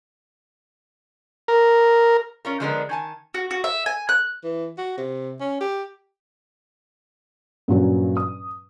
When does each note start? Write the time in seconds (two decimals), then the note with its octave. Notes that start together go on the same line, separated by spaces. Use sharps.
1.48 A#4
2.45 C#4 F4 A#4
2.60 D3 F3 G#3 B3 D4 A#4
2.89 D#3 G#5 A5
3.34 F#4
3.51 F#4
3.64 E5
3.86 G#5
4.09 F#6
4.44 E3
4.78 F#4
4.97 C3
5.40 C#4
5.60 G4
7.68 G2 A#2 F#3 C#4
8.17 D#6